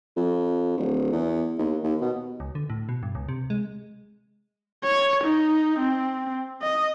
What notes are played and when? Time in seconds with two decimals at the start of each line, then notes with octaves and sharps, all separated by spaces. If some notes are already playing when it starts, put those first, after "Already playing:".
0.16 F2
0.77 D1
1.12 E2
1.58 D#2
1.83 D#2
2.01 B2
2.40 C#2
2.55 D3
2.70 A2
2.89 B2
3.03 G2
3.15 C#2
3.29 C3
3.50 G#3
4.84 C#5
5.24 D#4
5.79 C4
6.62 D#5